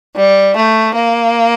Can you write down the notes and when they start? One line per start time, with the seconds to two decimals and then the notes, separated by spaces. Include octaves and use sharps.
0.15 G3
0.55 A3
0.95 A#3